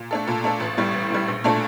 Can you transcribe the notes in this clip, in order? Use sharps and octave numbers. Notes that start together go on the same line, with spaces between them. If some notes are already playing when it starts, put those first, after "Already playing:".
Already playing: A#2
A3 D4 A4
A#2
A3 D4 A4
A1
A2 G3
A1
A2 G3
A#1
A#2 A3 D4